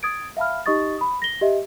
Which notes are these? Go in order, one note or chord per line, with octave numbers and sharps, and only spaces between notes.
D#6 G#6 A6 D7
E5 F5 A5 B5 F6
D#4 G4 D#5 C#6 D#6 A6
B5 D#6
A#6 G7
G4 D#5 E5